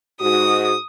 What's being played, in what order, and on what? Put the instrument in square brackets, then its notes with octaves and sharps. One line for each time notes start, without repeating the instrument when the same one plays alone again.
[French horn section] G#2 F#4 [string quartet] D#6